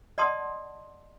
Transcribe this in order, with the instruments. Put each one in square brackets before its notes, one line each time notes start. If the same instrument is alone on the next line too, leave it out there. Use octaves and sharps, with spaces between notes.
[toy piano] D5 D#5 F#5 A5 C6 D#6